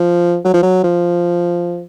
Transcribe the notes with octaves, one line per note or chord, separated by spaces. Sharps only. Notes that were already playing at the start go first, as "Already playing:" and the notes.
Already playing: F3
F#3
F3
F#3
F3